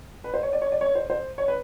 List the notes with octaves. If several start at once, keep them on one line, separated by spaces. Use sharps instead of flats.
B4
C5
C#5
D5
C#5
D5
C#5
C5
C5
C#5
B4